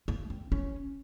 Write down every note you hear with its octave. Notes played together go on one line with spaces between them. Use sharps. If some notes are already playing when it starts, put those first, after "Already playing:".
A#3
C4
C#4